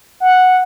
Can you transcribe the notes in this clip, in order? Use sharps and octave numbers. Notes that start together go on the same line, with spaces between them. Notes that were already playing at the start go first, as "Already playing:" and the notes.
F#5